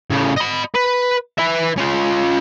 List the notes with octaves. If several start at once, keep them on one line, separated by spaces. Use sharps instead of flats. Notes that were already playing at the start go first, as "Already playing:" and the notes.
A2 C#3
D#5 B5
B4
B4 E5
C#4 F4